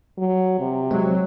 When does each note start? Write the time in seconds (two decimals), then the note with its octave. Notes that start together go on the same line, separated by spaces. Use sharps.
0.18 F#3
0.60 C3
0.91 F#3 G#3 C4